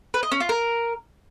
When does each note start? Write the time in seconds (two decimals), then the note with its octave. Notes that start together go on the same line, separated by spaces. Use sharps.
0.14 B4
0.23 D#5
0.32 C#4
0.40 F4
0.49 A#4